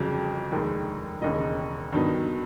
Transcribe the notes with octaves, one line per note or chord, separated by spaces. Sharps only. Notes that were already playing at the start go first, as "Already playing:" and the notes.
Already playing: G1 F2 C#3 F#3
F1 D#2 D#3 G#3
E1 D#2 C#3 D#5
G2 D#3 F#3 B3 D#4